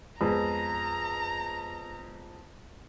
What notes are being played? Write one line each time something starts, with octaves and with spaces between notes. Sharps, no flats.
F2 G#3 B3 A#5